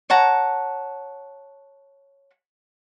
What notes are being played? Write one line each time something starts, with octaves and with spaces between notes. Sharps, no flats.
C#5 F#5 A5 A#5